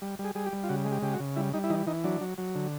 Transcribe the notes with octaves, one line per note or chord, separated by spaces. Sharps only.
G3
G3
G#4
G3 G#4
G4
G3
F4
C#3 F#4
G#3
G4
C#3 G4
F#4
C#3
G3 E4
G3 D#4
E4
E3 D#4
E3 D#4
F#3 D4
F#3
F#3
D3